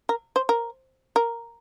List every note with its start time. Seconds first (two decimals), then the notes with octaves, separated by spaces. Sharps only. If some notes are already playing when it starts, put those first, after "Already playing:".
0.09 A#4
0.36 C5
0.49 A#4
1.16 A#4